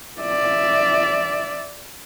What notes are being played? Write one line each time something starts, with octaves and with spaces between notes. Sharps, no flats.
D5 E5